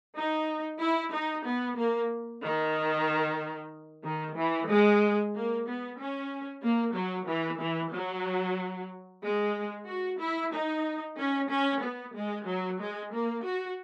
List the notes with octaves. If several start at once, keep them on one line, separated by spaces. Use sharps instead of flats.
D#4
E4
D#4
B3
A#3
D#3
D#3
E3
G#3
A#3
B3
C#4
A#3
F#3
E3
E3
F#3
G#3
F#4
E4
D#4
C#4
C#4
B3
G#3
F#3
G#3
A#3
F#4